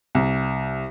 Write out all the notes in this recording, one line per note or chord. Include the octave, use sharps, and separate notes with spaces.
C2